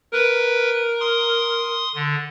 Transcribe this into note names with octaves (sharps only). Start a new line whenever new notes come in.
A#4 B4
C6 D#6
D3